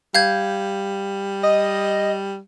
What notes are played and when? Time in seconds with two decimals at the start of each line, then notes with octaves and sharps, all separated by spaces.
0.15 G3 F5 G6 G#6
1.43 D#5